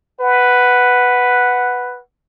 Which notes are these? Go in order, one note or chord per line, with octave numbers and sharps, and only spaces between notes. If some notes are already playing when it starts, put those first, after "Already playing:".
B4 F#5